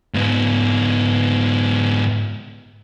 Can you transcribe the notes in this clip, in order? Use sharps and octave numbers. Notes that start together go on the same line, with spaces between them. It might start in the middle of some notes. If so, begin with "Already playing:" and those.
G#2 B3